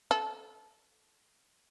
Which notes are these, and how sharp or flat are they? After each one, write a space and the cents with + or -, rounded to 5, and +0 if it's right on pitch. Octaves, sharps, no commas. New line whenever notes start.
A4 -15